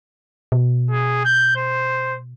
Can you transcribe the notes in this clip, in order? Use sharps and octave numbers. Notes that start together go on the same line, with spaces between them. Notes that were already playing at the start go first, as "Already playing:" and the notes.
B2
G#4
G6
C5